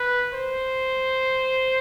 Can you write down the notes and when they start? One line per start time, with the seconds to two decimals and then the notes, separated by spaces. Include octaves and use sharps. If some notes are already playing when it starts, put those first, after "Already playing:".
Already playing: B4
0.33 C5